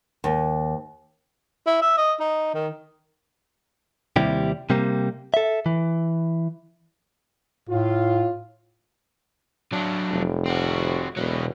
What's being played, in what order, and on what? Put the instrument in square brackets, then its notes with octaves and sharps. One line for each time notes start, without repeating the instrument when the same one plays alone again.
[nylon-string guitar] D#2
[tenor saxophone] E4
E5
D#5
D#4
D#3
[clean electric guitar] D#2 C3 G3 E4 G4
C3 G3 A#3
A4 E5
E3
[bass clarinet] A2 [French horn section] F4
[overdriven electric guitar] F#3 D4
[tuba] F1
[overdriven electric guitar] C4 F#4
[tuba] E1 [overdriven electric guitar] B2 F#3